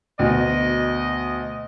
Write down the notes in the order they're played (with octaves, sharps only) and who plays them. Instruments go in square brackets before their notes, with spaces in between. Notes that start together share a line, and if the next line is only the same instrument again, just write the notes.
[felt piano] D2 B2 [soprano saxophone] D#5